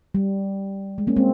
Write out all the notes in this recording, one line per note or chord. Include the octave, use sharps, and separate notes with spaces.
G3
G#3
A#3 C#4
G#3 C4